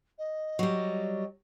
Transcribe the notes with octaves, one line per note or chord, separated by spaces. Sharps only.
D#5
F#3 G3